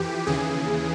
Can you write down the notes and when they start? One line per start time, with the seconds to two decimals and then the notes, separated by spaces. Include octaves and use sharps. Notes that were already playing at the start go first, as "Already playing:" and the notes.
Already playing: F2 E3 G4
0.27 D#2 C#3 E3 G#4